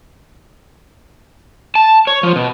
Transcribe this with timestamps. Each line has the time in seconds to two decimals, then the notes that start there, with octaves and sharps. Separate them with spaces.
1.75 A5
2.07 C#5
2.23 F3
2.36 B2